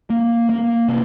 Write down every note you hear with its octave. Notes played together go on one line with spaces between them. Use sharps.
A#3
A#3
C3